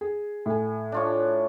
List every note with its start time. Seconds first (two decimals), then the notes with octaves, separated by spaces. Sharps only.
0.01 G#4
0.46 A2 G#5
0.92 D4 F4 C#5